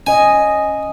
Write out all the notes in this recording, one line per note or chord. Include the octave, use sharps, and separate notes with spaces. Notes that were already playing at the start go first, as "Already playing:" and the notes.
C#4 D#5 G#5